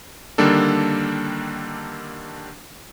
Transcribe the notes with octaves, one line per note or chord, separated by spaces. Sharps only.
D3 D#3 G3 A#3 D4 A4